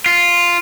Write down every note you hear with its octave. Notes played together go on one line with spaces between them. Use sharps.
F4